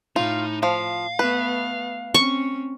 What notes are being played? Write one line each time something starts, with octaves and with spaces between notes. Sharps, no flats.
A2 D#4 F4
F3 F5
A3 B3 B4
C4 C#4 C#6